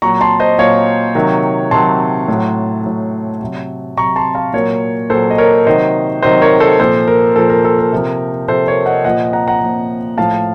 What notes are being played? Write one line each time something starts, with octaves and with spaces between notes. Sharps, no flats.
A#2 F#3 A#5 C#6
A5 C6
C5 D#5
A#2 F#3 C#5 F5
C3 D#3 F#3
C3 D#3 F#3 A5 C6
A2 F#3
A2 F#3
C3 F#3
C3 F#3 A#5 C#6
A5 C6
F5 A5
A#2 F#3 A#4 C#5
A#2 F#3 A4 C5
D#5
A#4 C#5
C3 D#3 F#3 C5 D#5
C3 D#3 F#3 C5 D#5
A#4 C#5
A4 C5
A#2 F3 A4 C5
A#4
A#2 F3 A4
A#4
A4
A#4
C3 F3
C3 F3 A4 C5
A#4 C#5
D#5 F#5
A#2 F3 D#5 F#5
F#5 A#5
F#5 A#5
A#2 F3
A2 F3 F5 A5